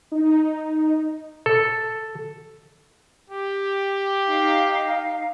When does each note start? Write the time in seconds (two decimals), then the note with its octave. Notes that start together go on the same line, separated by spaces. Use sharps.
0.12 D#4
1.46 A4
3.30 G4
4.26 D#4 F5